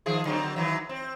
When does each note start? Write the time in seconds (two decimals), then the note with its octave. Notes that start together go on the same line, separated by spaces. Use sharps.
0.06 D#3 F3 G#4
0.25 D3 F#3 C4
0.56 D#3 E3 F#3
0.89 C4